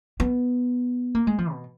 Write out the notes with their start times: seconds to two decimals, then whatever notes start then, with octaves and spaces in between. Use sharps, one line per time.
0.20 B3
1.15 A#3
1.27 G#3
1.38 F3
1.51 B2